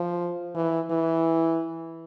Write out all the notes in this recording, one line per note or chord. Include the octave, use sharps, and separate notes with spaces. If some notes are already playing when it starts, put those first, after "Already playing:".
Already playing: F3
E3
E3